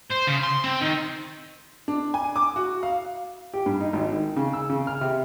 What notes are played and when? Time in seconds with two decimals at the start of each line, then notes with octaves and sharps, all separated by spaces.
0.11 C5
0.28 C#3
0.44 C6
0.64 C4
0.81 D#3
1.88 D4
2.14 G#5
2.36 D6
2.56 F#4
2.83 F5
3.54 G4
3.66 G2
3.80 D#4
3.93 G#1
4.12 D#3
4.36 C#3
4.53 E6
4.70 C#3
4.87 F6
5.01 C3